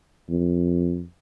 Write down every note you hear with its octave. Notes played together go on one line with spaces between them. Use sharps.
F2